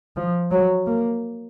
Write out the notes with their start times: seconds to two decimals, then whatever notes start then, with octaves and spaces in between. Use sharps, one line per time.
0.16 F3
0.51 F#3
0.86 A#3